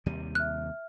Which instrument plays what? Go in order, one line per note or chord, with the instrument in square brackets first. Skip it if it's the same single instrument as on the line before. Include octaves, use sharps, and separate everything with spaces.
[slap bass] D#2 C3 G3 [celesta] D#7
[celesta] E5 F6 [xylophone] F#6